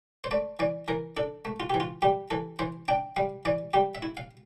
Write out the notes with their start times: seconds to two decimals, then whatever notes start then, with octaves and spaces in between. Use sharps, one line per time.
0.24 C5
0.31 A3 D5
0.59 E3 D5
0.88 E3 A#4
1.17 D4 A4
1.45 A3
1.60 F4
1.70 E3 G4
1.80 F4
2.02 G3 G4
2.30 E3 A4
2.59 E3 C5
2.88 D4 G5
3.16 G3 F5
3.45 E3 D5
3.73 G3 G4
3.95 E5
4.02 E4
4.17 F5